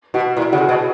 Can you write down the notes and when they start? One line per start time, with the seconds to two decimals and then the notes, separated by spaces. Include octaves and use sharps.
0.14 B2 F#4
0.37 A#2 E4
0.52 C#3 F#4
0.61 G#4
0.69 B2